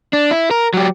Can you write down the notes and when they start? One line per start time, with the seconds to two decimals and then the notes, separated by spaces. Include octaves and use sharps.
0.13 D4
0.31 E4
0.51 A#4
0.74 F#3 G4